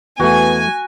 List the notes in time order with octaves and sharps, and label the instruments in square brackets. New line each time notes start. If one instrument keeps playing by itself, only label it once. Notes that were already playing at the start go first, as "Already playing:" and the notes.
[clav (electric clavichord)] E2 A3 [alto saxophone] B3 [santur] F#4 [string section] G#5